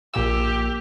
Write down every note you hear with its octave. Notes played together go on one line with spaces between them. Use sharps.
A#1 A#2 G4 E6